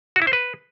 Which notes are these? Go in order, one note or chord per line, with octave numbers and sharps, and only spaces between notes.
F#4
E4
C5
B4